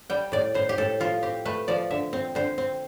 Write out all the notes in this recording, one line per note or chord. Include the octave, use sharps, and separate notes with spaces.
G3 G5
A2 D5
A2 C5
G4
A2 A4
F3 F4
C4 G4
A3 B4
F3 D5
D3 E5
C4
D3 C5
C4